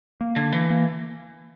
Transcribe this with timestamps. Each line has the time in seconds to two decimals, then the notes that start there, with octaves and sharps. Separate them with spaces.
0.21 A#3
0.36 D3
0.52 E3
0.70 A#3